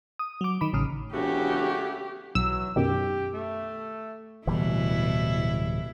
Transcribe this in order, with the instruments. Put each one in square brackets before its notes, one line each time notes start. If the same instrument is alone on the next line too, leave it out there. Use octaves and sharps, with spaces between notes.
[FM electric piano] D#6
F#3 D6
D#3 B5
A1 C#3 D#6 F6
[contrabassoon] E1 [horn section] C#3 A3 F#4 [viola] G4
[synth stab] B1 E6 [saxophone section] E3 F#3
[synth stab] F#2 B2 D#3 [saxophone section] G4
[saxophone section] A3
[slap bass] D1 E3 G3 [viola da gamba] B2 E4